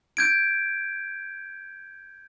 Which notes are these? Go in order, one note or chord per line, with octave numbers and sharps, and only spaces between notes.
G6 G#6 D7